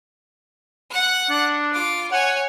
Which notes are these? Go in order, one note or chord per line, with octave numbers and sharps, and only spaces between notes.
F#5 F#6
D4
F4 D6
C#5 F#5 G#5